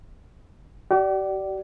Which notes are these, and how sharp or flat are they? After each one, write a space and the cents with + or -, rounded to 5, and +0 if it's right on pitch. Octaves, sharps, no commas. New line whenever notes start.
G4 -45 D5 +0